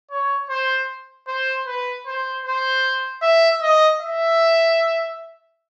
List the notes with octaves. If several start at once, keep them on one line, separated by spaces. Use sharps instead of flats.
C#5
C5
C5
B4
C5
C5
E5
D#5
E5